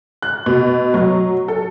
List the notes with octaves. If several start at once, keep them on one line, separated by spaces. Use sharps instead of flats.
F#6
B2
F#3
A4